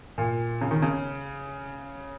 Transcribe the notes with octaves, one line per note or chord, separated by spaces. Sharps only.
A#2
C#3
D#3
C#3